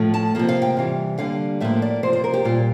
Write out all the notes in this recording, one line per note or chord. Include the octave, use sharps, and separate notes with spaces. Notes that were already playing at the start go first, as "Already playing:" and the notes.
Already playing: A2 F3 A3
A5
C3 F3 A#3
F5
G5
C3 E3 G3
D3 G3 A#3 F5
A2 F3 A#3 E5
D5
C3 F3 A#3 C5
C5
A#4
G4
A#2 G3 A#3 F4